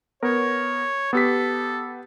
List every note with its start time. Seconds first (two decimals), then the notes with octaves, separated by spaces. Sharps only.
0.23 B3 A#4 C#5
1.13 B3 G4 A4 B6